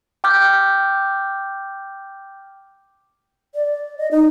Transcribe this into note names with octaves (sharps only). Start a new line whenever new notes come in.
G5 D6 F6 G6
D5
D#5
D#4